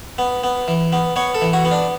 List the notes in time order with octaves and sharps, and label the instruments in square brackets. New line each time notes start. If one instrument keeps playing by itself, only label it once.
[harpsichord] B3
B3
E3
B3
B3 C#5
A4
E3
F#4
B3
D4